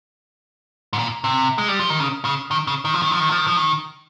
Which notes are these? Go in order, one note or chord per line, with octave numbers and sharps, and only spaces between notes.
G#2
A#2
C3
G#3
G3
F3
D#3
C#3
C#3
D#3
C#3
D#3
F3
D#3
F3
D#3
F3
D#3
F3
D#3